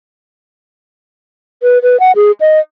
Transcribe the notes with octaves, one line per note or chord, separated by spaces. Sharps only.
B4
B4
F#5
G#4
D#5